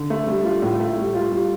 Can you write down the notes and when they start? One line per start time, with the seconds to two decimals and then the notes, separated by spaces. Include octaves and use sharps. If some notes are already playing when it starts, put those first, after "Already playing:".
Already playing: D3
0.10 A3
0.27 G3
0.45 F4
0.62 A2
0.80 A3
0.97 G3
1.15 F4
1.32 G3